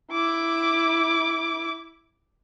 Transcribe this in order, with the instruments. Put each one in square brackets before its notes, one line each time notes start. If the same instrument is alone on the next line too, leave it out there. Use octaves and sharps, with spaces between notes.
[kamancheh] E4 D6